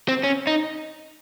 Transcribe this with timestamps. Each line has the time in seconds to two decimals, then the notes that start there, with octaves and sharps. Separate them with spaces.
0.08 C4
0.24 C#4
0.47 D#4